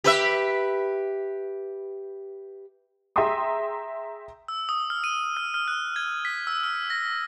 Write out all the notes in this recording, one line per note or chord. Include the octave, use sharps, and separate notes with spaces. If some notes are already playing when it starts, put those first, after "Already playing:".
G4 B4 E5
G#4 E5 G5 A#5 C6 D#6
E6
D#6
F6
D#7
F6
F6
F#6
G#6
B6
E6
F6
A#6